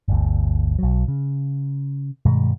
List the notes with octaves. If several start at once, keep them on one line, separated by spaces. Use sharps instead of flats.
G1 D2
B1 F#3
C#3
G2 B2 D#3 G#3